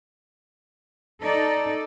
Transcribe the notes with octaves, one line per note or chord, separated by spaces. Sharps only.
D#4 A4 D5